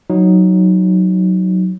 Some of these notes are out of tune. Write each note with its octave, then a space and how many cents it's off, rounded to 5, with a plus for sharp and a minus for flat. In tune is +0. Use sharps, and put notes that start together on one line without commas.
F#3 +0 D#4 +0